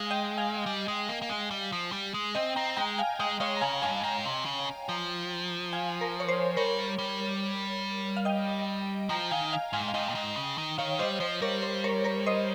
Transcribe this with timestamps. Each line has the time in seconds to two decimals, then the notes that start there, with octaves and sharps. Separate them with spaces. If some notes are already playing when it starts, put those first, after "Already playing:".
Already playing: G#3 F5 G#5
0.11 D#5 G5
0.38 F5 G#5
0.66 G3
0.88 G#3
1.09 A#3
1.22 A#3
1.29 G#3
1.51 G3
1.72 F3
1.92 G3
2.14 G#3
2.35 C4 D#5 G5
2.56 C4 G5 A#5
2.77 G#3 G5 A#5
2.98 F5 G#5
3.19 G#3 D#5 G5
3.40 G#3 C#5 F5
3.57 A#5
3.61 C#3 F5 G#5
3.82 G2 F5 G#5
4.03 G#2 G5 A#5
4.25 C3
4.45 C#3
4.89 F3
5.73 F5 G#5
6.01 A#4
6.20 C#5
6.28 C5
6.56 G3 A#4 C#5
6.98 G3
8.17 F5
8.25 D#5 G5
9.09 F3 G5 A#5
9.31 D#3 F5 G#5
9.52 F5 G#5
9.73 G#2 F5 G#5
9.88 F5
9.94 G#2 D#5 G5
10.09 A#2
10.15 G#2
10.36 C#3
10.58 D#3
10.78 D#3 C#5 F5
10.99 G3 C5 D#5
11.20 F3 C5
11.42 G3 A#4 C#5
11.62 C5
11.84 A#4 C#5
12.04 A#4 C#5
12.26 C5 D#5